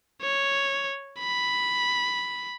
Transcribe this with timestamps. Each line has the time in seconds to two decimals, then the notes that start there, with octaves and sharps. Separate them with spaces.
0.21 C#5
1.20 B5